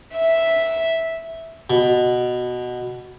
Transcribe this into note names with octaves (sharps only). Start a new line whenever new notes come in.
E5
B2